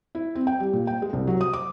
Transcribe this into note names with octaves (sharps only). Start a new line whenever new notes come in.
E4
C4
G5
G3
A#2
G5
G#3
C2
F#3
D#6
D6